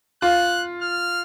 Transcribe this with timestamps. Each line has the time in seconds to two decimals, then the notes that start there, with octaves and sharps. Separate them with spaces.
0.22 F4 F#6
0.82 F6